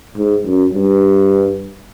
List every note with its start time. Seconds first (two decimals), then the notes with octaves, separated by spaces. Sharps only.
0.17 G#2
0.45 F#2
0.74 G2